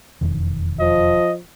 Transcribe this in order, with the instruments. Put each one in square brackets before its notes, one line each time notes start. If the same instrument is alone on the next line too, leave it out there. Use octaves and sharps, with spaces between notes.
[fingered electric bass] E1 F2 D#3
[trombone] F3 [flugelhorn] D#5